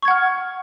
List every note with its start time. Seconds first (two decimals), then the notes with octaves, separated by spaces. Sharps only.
0.02 C#6
0.05 G#6
0.08 F#5
0.11 F6